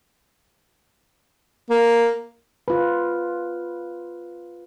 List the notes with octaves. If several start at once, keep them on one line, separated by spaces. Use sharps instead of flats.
A#3
F4 B4